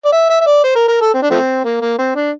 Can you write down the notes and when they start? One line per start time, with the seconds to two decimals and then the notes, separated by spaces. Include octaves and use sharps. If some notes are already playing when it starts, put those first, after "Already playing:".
0.05 D5
0.12 E5
0.30 E5
0.41 E5
0.47 D5
0.64 C5
0.75 A#4
0.88 A#4
1.01 A4
1.14 C4
1.22 D4
1.30 F3 A3 C4
1.65 A#3
1.81 A#3
1.98 C4
2.15 D4